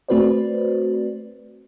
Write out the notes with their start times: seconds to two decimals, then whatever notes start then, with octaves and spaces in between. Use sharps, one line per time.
0.09 A3 C4 F#4 B4 C5 D5